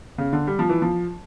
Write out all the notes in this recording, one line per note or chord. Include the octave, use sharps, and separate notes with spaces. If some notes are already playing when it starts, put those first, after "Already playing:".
C#3
D3
G3
F3
E3
F3